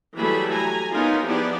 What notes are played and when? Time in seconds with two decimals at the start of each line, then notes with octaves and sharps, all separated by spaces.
0.17 E3 F#3 G3 A3 G#4 B5
0.54 G#5 A#5
0.93 B3 C#4 D#4 F4 A#4
1.26 F3 B3 E4 G4 G#4 D5